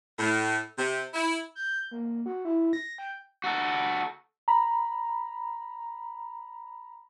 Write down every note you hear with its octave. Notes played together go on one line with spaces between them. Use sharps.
A2
C3
E4
G6
A#3
F#4
E4
A#6
G5
F#4 A4
A#5 B5